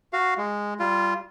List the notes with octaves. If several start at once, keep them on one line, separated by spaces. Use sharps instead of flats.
F#4 F5
G#3
G3 F4